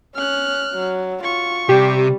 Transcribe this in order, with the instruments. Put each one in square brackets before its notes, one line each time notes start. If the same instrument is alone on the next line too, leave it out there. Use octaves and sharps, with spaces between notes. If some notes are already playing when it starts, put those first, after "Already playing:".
[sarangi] C#4 [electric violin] F6 F#6
[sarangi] F#3
[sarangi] F4 [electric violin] C#6
[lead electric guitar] C3 [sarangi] G3 [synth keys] G4